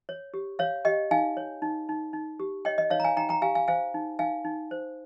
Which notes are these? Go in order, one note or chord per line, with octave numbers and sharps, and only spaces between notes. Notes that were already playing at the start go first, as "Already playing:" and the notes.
C#5
G4
C#5 F5
G4 D#5 G5
D#4 F5 G#5
C#5
D#4
D#4
D#4
G4
C#5 D#5 G5
D#5
D#4 C#5 F5
A#5
F5 G#5
D#4 G5 A#5
G5 A#5
G4 F5 G#5
F5 G#5
C5 F5 G#5
D#4
D#4 F5 G#5
D#4
C5